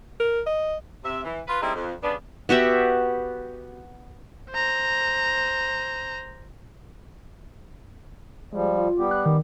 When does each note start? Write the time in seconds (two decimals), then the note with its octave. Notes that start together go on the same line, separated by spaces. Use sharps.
0.20 A#4
0.46 D#5
1.04 C3 E5
1.25 E3
1.48 F4 B4
1.61 G3 C4 D#4 E4 G#4 A4
1.75 F2
2.03 C#3 G3 B3 D4
2.49 B3 F#4 G4 E5
4.51 C5 A#5
8.52 F3 G3 G#3
8.78 F4
8.98 G3 B3 G4
9.11 F#6
9.26 D#3